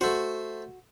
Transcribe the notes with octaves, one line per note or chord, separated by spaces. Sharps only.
A3 F#4 C5